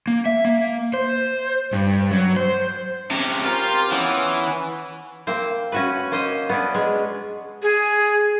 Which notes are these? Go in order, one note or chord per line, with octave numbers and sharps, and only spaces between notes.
A#3
E5
A#3
C5
G2
F#3
C5
C3 C#4
F4 G4 A#4 C5
E3 B3 C#4
A#3 C4 C5
C#4 F#4 B4
A#3 C#4 C5 D#5
B3 C#4 D4
G#3
G#4